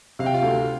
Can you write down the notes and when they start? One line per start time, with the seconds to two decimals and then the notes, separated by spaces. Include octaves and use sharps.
0.19 C3 F5
0.26 G5
0.34 F4 F5
0.43 D2